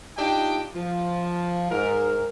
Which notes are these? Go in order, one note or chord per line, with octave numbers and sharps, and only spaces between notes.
D4 D#4 F4 G4 D#5 G5
F3
G#2 A#4